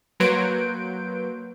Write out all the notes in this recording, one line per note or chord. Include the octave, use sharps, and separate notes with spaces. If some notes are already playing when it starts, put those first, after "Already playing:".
F#3 A#3 B4 C6 G6 D7